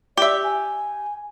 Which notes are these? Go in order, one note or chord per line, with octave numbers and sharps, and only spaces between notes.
G4 D5 E5
G#5